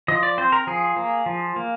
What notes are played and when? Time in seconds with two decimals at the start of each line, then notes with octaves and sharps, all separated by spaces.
0.08 F3 D#5
0.23 D5
0.38 C4 C5
0.52 A#4
0.67 F3 G#4
0.96 A#3
1.26 F3
1.56 A#3